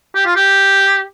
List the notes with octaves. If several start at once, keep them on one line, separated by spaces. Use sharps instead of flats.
G4
F4
G4